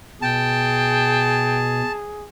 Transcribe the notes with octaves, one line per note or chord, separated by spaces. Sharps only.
B2 G#4 G5 A5